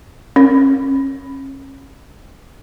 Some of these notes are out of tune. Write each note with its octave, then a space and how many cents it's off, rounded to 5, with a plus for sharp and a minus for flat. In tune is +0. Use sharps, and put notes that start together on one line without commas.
C#4 -35